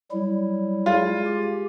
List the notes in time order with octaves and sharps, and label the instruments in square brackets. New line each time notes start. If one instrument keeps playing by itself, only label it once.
[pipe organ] F#3 G3 E4
[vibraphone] G#3 G#4 [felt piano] F4
[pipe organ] G4